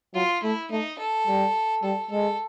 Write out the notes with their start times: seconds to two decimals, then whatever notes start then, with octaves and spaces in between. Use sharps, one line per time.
0.14 F#3 F4
0.43 A3 E4
0.71 A3 D#4
0.99 A4
1.27 G3
1.83 G3 A4
2.11 G#3 A4